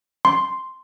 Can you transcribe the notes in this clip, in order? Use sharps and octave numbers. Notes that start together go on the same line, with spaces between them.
C6